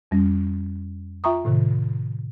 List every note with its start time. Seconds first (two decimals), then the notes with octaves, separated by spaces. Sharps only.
0.11 F2 G3 C#4
1.24 F4 E5 G5 A#5 C#6 D#6
1.45 A2 C3 D#3